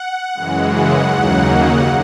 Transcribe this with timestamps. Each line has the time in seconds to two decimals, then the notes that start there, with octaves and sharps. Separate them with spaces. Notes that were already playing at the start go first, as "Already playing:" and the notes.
Already playing: F#5
0.35 F#2 C#3 E3 G#3
0.72 F#5
1.09 D#2 C#3 F#3 A#3 D#4